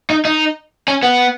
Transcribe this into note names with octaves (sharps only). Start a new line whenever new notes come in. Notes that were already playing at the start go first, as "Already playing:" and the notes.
D#4
D#4
C#4
B3